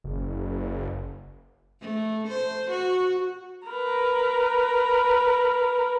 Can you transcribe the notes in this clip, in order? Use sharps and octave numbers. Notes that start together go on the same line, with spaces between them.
F#1
A3
C5
F#4
A#4 B4